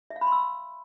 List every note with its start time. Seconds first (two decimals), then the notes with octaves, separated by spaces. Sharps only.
0.10 E5
0.16 F5
0.21 B5
0.27 C6
0.32 E6